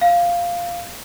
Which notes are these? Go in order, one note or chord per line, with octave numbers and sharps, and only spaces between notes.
F5